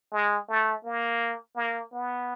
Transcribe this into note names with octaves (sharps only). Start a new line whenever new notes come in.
G#3
A3
A#3
A#3
B3